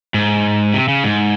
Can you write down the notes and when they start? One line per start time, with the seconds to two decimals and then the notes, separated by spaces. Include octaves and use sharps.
0.14 G#2
0.74 C3
0.88 C#3
1.04 G#2